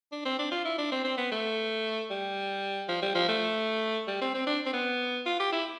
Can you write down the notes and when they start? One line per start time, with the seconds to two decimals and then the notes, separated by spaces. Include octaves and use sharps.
0.12 D4
0.25 C4
0.39 D4
0.52 F4
0.65 E4
0.78 D4
0.92 C4
1.04 C4
1.18 B3
1.31 A3
2.10 G3
2.88 F3
3.02 G3
3.15 F3
3.28 A3
4.07 G3
4.21 C4
4.34 C4
4.47 D4
4.66 C4
4.73 B3
5.26 F4
5.40 G4
5.52 E4